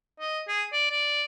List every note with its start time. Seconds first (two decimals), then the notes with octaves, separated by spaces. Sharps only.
0.20 D#5
0.48 G#4
0.73 D5
0.91 D5